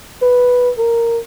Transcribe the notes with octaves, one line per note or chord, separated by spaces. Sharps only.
B4
A#4